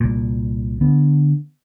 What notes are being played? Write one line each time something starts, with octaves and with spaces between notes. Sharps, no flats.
C2 A#2
D3 B3